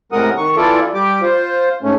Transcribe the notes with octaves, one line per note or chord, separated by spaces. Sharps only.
A2 C3 G#3 A#4 F#5 D#6
D#3 C#6
E3 B3 E4 F4 A4 D5
G3 G4 D6
F4 C5
G#2 A3 C#4